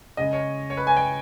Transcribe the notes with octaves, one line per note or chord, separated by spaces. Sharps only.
C#3 G#3 D#5
C#5
C#5
B4
G#5
G5